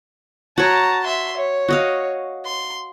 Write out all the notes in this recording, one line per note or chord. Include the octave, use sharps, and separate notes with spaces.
F#4 C#5 A5 A#5
E5 C6
C#5
F#4 D#5 F5
C6